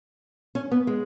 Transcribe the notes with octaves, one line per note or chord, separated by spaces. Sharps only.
C#4
B3
G#3